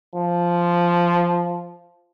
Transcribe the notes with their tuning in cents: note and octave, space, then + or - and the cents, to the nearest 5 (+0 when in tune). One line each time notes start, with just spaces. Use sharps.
F3 -5